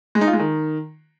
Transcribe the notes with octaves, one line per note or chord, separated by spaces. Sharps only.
G#3
D#4
F4
G#3
D#3